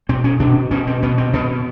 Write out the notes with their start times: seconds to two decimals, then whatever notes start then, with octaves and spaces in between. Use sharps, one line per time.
0.09 B2 C4
0.24 C#4
0.40 B2 D4
0.71 B2 C#4
0.87 C4
1.03 B2 B3
1.18 C4
1.33 B2 B3